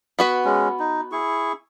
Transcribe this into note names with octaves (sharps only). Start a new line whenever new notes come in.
B3 F#4 B4
G#3 C#4
D#4
E4 G#4 C#6